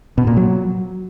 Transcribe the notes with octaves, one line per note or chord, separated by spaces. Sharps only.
B2
A#2
F#3